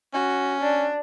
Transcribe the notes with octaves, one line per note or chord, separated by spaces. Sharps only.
C#4 F#4
D4